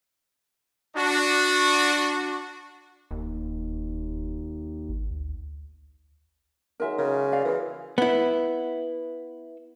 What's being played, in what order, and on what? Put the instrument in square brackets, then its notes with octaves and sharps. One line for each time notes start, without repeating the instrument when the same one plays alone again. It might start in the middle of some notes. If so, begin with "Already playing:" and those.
[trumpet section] D4 F#4
[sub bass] E1 [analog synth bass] D#2
[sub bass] G#1
D2
[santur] F#3 G#3 D#4 [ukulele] A#4 E5
[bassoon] C#3 [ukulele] A#4 [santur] E5
[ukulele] D5 F5
[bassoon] E3 [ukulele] G#4 A#4
[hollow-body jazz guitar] B3 E4